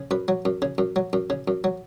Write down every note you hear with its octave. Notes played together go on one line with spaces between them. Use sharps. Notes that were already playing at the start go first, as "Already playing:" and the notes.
Already playing: C#3
F#2 B4
F#3
F#2
C#3
F#2
F#3
F#2
C#3
F#2
F#3